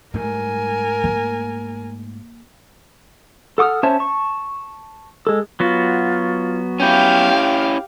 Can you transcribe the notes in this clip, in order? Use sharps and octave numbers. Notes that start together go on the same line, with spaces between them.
G#2 G3 A3 A#4 G#5
A#3
A4 F#5 D6 D#6 F6
C#4 C5 C#5 E5 A5
A5 C#6
G#3 A4
F#3 B3 F4 F#4
C#4 E4 G4 F5 G5